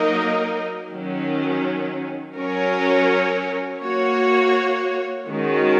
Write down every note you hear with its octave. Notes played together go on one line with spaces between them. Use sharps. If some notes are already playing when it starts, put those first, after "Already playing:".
Already playing: F#3 A#3 D#4 A#4 D#5
D#3 F#3 C#4
F#3 C#4 A#4 C#5
A#3 F#4 C#5
D#3 G#3 C#4 F#4